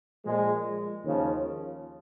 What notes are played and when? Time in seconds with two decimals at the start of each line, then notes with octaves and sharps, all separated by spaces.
0.23 A#2 F3 G#3
1.04 D#2 C#3 F3